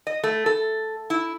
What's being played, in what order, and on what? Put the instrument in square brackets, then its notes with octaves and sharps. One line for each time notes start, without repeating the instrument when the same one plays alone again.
[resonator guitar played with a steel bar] D#5
A3
A4
E4